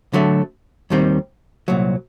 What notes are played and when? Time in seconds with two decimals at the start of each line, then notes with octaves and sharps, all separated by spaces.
0.13 D3 F#3 A3
0.90 D#2 D#3 G3 C4
1.68 C2 A#2 F#3